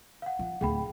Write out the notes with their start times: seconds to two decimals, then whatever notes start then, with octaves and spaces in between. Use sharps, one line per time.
0.22 F5 F#5
0.39 F3
0.61 D1 D2 G#4 G5 B5